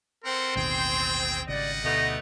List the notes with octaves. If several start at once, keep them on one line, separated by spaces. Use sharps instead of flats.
C4 A4 A#4 F#5 C6
A1 D#2 B2 G#4 G5
G#1 C#3 G3 D5 D#5 F#5
D2 B2 A3 B3 D#4 A#6